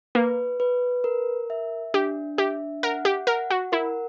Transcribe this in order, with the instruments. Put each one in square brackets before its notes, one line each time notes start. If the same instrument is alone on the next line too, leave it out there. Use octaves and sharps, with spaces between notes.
[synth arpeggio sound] A#3 [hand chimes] B4
[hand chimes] B4
A#4
E5
[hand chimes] D4 [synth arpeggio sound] G4
[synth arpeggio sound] G4 [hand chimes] E5
[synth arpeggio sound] A#4 [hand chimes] F#5
[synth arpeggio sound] G4
[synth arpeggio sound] A#4 [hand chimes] F#5
[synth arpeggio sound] F#4
[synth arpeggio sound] E4 [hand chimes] A#4